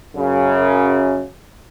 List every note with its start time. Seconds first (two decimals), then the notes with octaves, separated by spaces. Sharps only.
0.16 F#2 C#3